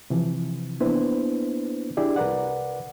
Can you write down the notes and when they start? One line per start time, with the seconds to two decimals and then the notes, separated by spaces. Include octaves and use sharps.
0.10 C3 E3 F3
0.80 A#3 B3 D4 E4 B4 C5
1.97 D4 E4 G4 G#4 D5
2.16 C2 A#4 B4 D5 F#5